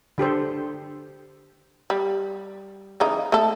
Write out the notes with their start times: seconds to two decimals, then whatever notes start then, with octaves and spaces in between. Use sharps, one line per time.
0.18 D3 G4 A4 C5
1.90 G3
3.00 C#3 E3 D#4
3.32 A3 A4